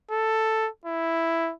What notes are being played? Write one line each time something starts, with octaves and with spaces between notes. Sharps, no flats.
A4
E4